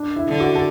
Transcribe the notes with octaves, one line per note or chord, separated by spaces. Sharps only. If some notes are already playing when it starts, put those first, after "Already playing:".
Already playing: D4
E4
D3
F#4
A4